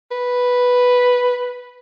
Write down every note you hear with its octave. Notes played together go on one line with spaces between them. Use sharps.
B4